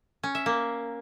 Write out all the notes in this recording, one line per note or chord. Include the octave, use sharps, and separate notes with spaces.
C#4
E5
A#3